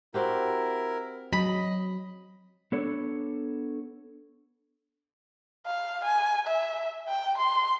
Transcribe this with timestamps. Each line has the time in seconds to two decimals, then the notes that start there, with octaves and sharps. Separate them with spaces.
0.14 C4 E4 F#4 G4 A#4
1.33 F#3 D#5 B5
2.72 B3 D4 A4 C#5
5.66 F5
6.04 G#5
6.47 E5
7.08 G5
7.37 C6